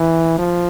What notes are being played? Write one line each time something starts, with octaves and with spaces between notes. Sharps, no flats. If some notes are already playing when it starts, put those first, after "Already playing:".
Already playing: E3
F3